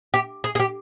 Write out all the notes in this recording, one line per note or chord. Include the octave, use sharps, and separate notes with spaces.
G4
G#4
G#4
G4